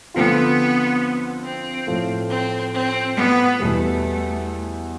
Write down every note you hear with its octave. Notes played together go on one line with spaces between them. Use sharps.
D3 F3 B3 C4 F4
C4
A2 F3 A3
C4
C4
B3
E2 B2 G3 A3 B3